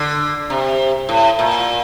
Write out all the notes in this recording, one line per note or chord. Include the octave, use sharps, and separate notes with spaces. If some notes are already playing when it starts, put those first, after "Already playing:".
Already playing: D3
C3
A2
A#2